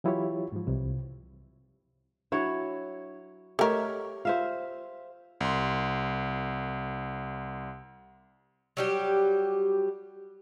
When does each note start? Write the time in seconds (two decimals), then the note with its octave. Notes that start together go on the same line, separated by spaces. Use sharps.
0.04 E3 F#3 E4 F4 G4 C#5
0.52 G#2 F3
0.67 C2 C3
2.32 F#3 D4 E4 C#5
3.59 A3 G4 A4 A#4 C#5 D#5 E5 F6
4.25 F4 C5 E5 F5
5.41 C2 C6
8.77 F#3 G3 G4